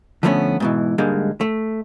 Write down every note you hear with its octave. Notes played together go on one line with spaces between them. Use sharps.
D3 F3 G3 A3 B3 C#4
G#2 B2 E3
G#2 D3 G3 G#3 A#3
A3